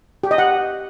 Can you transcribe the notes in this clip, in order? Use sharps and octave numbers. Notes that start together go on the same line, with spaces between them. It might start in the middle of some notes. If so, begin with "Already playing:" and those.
G4
D#5
F#5